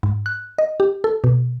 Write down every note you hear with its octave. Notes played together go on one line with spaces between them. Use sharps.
G#2
F#6
D#5
G4
A4
B2